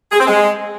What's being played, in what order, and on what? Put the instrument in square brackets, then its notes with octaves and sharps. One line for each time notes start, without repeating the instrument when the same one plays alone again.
[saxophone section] G#4
C4
G#3